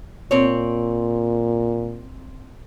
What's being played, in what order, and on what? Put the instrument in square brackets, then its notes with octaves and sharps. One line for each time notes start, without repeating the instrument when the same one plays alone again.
[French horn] A#2 [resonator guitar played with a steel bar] C4 C#5